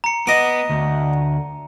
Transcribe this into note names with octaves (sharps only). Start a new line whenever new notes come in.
A#5 C#7
B3 D#5 D6
D2